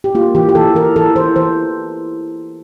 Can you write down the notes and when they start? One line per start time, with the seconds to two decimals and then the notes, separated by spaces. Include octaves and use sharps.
0.04 G4
0.15 A#3 F4
0.35 E3 G4
0.49 G4
0.55 E3 A4
0.75 E3 A#4
0.96 E3 A4
1.16 E3 C5
1.36 E3 C5